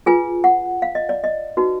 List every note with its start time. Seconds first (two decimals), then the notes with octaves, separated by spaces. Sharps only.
0.06 F4 G#4 B4 G#5
0.44 F#5
0.82 F5
0.95 D#5
1.09 D5
1.24 D#5
1.57 D#4 F#4 B4